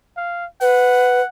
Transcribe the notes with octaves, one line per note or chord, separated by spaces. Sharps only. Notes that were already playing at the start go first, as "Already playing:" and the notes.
F5
B4 F#5